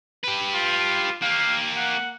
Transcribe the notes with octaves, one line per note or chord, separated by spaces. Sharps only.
G4 B4
F4
A#3 G4 F5
F#5